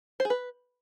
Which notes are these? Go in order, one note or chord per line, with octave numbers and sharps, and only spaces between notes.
C5
G#4
B4